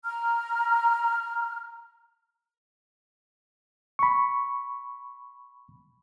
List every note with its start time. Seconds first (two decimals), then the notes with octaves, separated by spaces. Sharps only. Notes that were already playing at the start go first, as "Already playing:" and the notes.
0.05 A#5 F6
3.99 B5 C#6